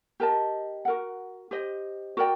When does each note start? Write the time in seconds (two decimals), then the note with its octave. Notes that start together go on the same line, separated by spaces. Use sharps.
0.20 G4 A#4 D#5 A5
0.85 F#4 A#4 F#5
1.51 G4 C5 D#5
2.17 F#4 A#4 D5 G5